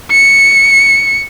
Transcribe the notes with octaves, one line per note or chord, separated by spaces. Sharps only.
C#7